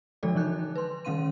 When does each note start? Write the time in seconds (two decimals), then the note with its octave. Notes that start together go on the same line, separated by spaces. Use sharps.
0.23 D3 F3 G#3 A4 D5
0.35 D3 E3 D#4 F#6 G6
0.75 B4 C6
1.05 D#3 G3 C#4 F5 C6 D#7